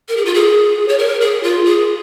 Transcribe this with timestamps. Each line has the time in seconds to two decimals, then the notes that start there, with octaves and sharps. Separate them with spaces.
0.08 A#4
0.17 G#4
0.25 F4
0.34 G#4
0.88 C#5
0.98 A#4
1.21 G#4
1.43 F4
1.65 G#4